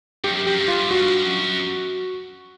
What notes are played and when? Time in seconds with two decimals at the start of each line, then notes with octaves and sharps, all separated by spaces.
0.24 G2 G4
0.32 F#2
0.47 F#2 G4
0.58 G2
0.68 F4
0.91 G2 F#4
1.24 F#2